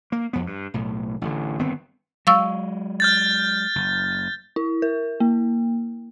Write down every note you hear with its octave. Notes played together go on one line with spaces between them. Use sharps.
A#3
F2 B3
G2
B1 A2
A1 D3
G1 D#3 B3 C4
F#3 G#3 F5 C#6 E6
F6 G6 A6
F#1
E4
A#4
A#3